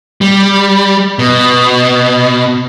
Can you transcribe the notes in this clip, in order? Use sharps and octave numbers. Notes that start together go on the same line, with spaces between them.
G3
B2